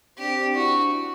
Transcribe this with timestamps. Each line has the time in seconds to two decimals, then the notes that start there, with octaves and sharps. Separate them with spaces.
0.18 C4 D4 G4
0.55 D4 E4 F#4